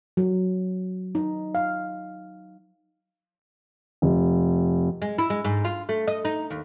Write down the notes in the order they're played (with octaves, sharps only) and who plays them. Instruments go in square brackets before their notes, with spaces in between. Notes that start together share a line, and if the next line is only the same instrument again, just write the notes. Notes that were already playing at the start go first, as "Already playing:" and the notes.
[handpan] F#3
D#4
F5
[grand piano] F1
[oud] G#3
E4
G#3
G#2
F4
A3
D#5
D#4
D#2